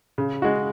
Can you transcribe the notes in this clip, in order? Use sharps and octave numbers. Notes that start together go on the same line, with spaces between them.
C#3
G#3 F#4